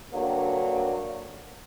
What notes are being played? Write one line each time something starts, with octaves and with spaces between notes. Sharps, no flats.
G2 D3 F#3 A#3